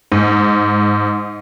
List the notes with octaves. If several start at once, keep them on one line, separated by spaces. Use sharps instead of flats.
G#2